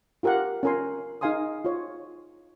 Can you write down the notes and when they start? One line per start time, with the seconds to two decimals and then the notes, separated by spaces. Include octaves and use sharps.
0.23 F4 G4 A#4 F5 F#5
0.63 C#4 F4 A#4 G#5 C6
1.21 D#4 G#4 F5 G#5 C6 D#6
1.65 F4 C#5